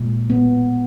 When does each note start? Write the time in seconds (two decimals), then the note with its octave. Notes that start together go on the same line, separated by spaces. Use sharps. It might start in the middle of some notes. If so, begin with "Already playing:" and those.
Already playing: A#2 G#3
0.30 B3